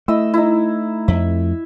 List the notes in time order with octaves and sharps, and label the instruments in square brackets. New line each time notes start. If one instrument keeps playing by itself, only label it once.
[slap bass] A3 [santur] E4 D#5 E6
[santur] D#4 E4
[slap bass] F2 A3 [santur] E5